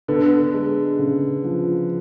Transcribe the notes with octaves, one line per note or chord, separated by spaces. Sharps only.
D3 B3
G#3
C#3
F3